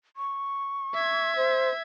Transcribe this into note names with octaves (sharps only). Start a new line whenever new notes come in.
C#6
E5 G#6
C5